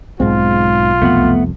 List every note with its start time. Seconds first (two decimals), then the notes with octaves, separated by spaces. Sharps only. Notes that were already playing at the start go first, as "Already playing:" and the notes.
0.20 B1 G#2 G#3 C4 F4
1.02 C2 F2 A3 B3 F#5